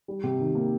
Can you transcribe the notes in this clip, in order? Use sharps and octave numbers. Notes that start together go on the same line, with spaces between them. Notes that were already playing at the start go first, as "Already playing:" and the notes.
G3
C3
D#3
A#3